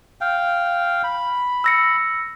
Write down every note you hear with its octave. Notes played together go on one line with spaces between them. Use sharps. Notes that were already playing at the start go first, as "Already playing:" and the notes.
F5 G5
B5
E6 A#6 C#7